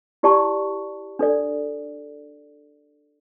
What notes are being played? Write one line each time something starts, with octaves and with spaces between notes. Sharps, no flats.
E4 G4 D5 A5 C#6
D4 A4 D5